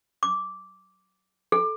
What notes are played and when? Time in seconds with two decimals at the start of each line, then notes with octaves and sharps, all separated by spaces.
0.23 D6
1.52 A4